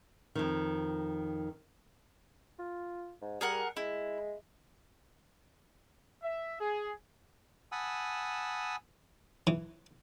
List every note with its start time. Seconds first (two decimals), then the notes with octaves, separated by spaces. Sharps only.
0.35 F2 D#3
2.59 F4
3.22 G#2
3.41 G3 G#4 A#4 F#5
3.77 G#3 E4
6.23 E5
6.59 G#4
7.72 F#5 G#5 A5 B5 D#6 E6
9.47 E3